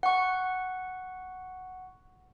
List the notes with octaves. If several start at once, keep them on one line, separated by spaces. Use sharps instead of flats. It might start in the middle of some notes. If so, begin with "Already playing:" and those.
F#5 C#6